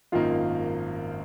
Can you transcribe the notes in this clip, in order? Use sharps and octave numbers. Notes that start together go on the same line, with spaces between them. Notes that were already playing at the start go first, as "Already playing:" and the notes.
G#1 F#2 D#3 A#3 D#4 F4 F5